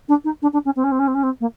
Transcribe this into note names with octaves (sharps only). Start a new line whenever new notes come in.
D4
D#4
D4
D4
C#4
C4
C#4
C4
C#4
C4
C#4
C4
A#3